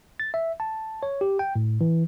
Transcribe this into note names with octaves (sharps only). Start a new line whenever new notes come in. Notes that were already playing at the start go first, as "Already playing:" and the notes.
A6
E5
A5
C#5
G4
G5
A2
E3